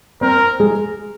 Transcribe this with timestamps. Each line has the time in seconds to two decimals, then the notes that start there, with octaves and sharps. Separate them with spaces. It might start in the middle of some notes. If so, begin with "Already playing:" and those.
0.21 C4 A#4 C5
0.60 G#3 G#4